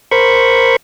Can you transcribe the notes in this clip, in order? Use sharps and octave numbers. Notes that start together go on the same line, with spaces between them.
A#4 C5 B5 C#6